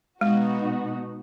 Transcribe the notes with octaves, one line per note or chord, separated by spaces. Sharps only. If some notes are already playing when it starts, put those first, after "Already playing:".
B2 G#3 B3 D#4 F#4